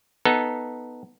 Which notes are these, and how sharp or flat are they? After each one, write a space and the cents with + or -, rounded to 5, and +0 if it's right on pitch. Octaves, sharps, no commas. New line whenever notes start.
B3 +0 D#4 +0 A4 +0